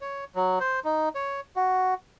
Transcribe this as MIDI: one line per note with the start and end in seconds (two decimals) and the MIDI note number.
0.01 0.24 73
0.35 0.59 54
0.60 0.80 72
0.84 1.09 63
1.15 1.40 73
1.56 1.94 66